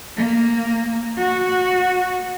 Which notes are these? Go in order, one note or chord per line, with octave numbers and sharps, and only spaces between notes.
A#3
F#4